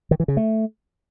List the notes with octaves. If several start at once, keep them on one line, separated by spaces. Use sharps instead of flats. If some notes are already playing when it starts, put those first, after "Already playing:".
D#3
E3
C#3
A3